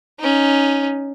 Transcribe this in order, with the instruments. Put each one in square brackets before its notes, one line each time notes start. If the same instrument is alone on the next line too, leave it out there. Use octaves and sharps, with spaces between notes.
[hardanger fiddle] C#4 D#4